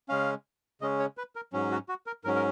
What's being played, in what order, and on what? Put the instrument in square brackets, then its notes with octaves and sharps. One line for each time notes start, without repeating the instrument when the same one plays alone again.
[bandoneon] C#3 G#3 C#4 F5
C#3 G#3 C#4 D#5
C#5
B4
A#4
G#2 F#3 C#4
F#4
F#4
A#4
G#2 F#3 C#4 A#4
A#4